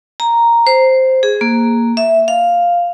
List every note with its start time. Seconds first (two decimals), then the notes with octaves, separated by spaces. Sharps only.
0.20 A#5
0.67 C5
1.23 G#4
1.41 A#3
1.97 E5
2.28 F5